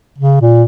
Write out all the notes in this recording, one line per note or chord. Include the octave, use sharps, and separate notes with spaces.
C#3
A#2